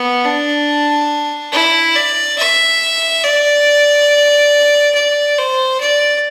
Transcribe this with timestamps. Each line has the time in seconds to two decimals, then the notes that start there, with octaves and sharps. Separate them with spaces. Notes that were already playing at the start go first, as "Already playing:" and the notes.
Already playing: B3
0.24 D4
1.53 E4
1.96 D5
2.38 E5
3.24 D5
4.95 D5
5.38 C5
5.81 D5